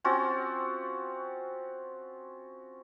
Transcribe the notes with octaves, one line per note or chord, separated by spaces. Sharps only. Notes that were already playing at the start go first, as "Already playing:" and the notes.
C4 C#4 F4 F#4